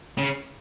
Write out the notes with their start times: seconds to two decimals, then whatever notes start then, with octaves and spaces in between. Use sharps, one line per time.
0.18 C#3